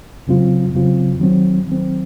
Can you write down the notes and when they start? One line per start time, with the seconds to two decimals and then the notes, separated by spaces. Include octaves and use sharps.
0.27 F2 C#3 F#3 C4 F4
0.74 F2 C#3 F#3 C4 F4
1.20 D#3 F#3 C4
1.67 D#3 F#3 C4